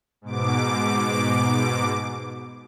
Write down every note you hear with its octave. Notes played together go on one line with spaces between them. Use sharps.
G#2 B2 D6